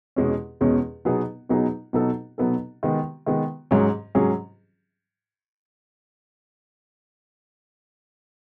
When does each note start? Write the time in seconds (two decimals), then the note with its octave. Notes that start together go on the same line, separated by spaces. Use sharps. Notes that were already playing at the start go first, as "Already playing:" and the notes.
0.16 E2 B2 G#3 C#4
0.61 E2 B2 G#3 C#4
1.05 B2 F#3 B3 D#4 G#4
1.49 B2 F#3 B3 D#4 G#4
1.93 B2 F#3 B3 D#4 A4
2.38 B2 F#3 B3 D#4 A4
2.83 D#3 G#3 B3
3.26 D#3 G#3 B3
3.71 G#2 F#3 C#4 G#4
4.15 G#2 F#3 C#4 G#4